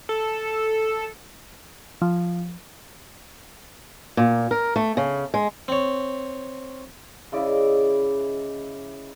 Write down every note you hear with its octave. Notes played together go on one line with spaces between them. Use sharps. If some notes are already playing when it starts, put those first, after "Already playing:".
A4
F3
A#2
A#4
A3
C#3
G#3
C4 C#5
C#3 E4 D5 D#5